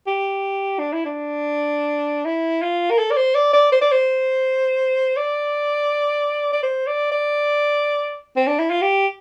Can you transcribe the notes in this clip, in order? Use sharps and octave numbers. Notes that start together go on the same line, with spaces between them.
G4
D4
E4
D4
E4
F4
A#4
A4
D5
C5
D5
D5
C5
D5
C5
D5
D5
C5
D5
D5
C4
D4
E4
F4
G4